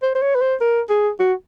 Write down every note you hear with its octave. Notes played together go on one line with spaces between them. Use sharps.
C5
C5
C#5
B4
C5
A#4
G#4
F#4